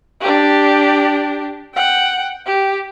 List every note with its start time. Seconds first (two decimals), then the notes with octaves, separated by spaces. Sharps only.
0.21 D4 G4
1.75 F#5 G5
2.46 G4